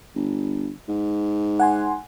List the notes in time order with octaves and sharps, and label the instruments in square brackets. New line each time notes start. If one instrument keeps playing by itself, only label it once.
[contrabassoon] G1
G#2
[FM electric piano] F#5 G#5 C6